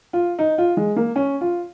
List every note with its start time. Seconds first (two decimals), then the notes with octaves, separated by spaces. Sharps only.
0.13 F4
0.39 D#4
0.58 F4
0.77 G#3
0.96 A#3
1.16 C#4
1.41 F4